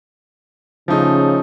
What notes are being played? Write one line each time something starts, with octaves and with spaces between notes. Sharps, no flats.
C#3 F3 A3 D#4